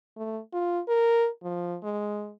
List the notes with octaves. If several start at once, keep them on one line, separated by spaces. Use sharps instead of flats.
A3
F4
A#4
F3
G#3